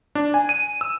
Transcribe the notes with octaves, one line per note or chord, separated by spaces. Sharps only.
D4
G#5
D#7
E6